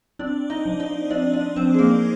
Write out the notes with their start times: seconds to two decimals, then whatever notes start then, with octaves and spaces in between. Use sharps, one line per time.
0.19 C4 D4 D5
0.50 D#4 D#5
0.65 F3
0.80 D#4 D#5
1.10 C4 D4 D5
1.34 D4 D5
1.56 F3 C4 C5
1.74 G#4
1.79 A#3 A#4